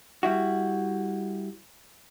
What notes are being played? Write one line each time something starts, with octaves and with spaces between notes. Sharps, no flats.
G3 E4 F#4